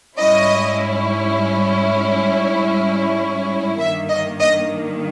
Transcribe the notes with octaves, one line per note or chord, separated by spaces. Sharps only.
G#2 G3 C#4 E4 D#5
G2 D#3 A#3 E5
D#5
D#5